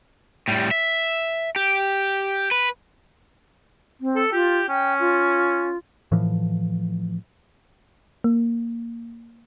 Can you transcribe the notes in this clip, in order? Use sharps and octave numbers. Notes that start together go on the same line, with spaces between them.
A2 G3
E5
G4
B4
C4
A4
F4 G4
C#4 G5
F4
A2 E3 F3
A#3